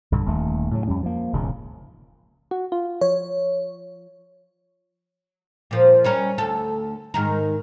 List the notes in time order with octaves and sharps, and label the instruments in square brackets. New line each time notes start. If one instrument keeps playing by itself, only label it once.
[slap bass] B1 G2 D3
D#1 D#2 A3
A2 C#3 F#3
F2 G3 C#4
F3 A#3
E1 C#2 G#2 C#3
[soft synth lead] F#4
F4
[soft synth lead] F3 [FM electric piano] C#5
[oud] A#2 F3
G3 C#4 A#4
D2 A4
G#2 D#3 A#4